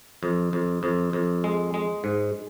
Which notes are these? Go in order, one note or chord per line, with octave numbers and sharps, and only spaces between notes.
F2
F2
F2
F2
G#3
G#3
G#2